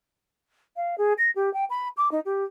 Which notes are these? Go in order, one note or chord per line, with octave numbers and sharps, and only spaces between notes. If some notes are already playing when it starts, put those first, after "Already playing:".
F5
G#4
A#6
G4
G5
B5
D6
D#4
G4